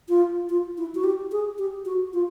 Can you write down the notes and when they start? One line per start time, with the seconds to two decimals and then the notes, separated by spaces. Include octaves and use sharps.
0.09 F4
0.49 F4
0.78 E4
0.95 F#4
1.04 G4
1.32 G#4
1.58 G4
1.85 F#4
2.13 F4